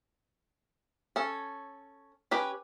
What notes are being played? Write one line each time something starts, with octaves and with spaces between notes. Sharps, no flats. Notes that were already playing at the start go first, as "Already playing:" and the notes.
C#4 A4
C#4 G4 B4